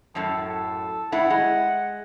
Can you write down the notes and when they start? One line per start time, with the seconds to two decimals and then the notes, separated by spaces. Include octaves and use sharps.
0.15 F#2 A2 A4
0.49 A4
1.12 A2 E4 F#5
1.30 G#3